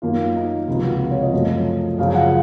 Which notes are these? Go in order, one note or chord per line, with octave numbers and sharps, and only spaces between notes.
F#2 D#3 A#3 F4
D#4
C#2 C3 F3 F4
F#4
F4
C#5
D#5
F#2 F3 A3
F#2 C#3 F3 F5
F#5